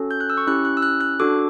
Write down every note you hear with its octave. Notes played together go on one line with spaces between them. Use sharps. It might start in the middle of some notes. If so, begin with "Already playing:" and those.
Already playing: C#4 F#4 A4
G6
F#6
E6
C#6
C#4 E4 G4 F#6
F#6
E6
F#6
F#6
D4 F#4 A4 D6